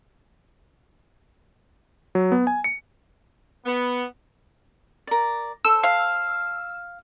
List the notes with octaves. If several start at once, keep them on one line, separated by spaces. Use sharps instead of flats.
F#3
B3
G#5
C#7
B3
A#4 D5
A4 C5 E6
F5